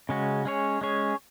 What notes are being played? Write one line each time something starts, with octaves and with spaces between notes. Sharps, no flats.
C#3 G#3 C#4 F#4
G#3 C#4 G#4 C#5
G#3 C#4 G#4 C#5